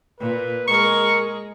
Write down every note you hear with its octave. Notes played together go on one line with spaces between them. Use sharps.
A#2 B4
G#3 A#4 C#6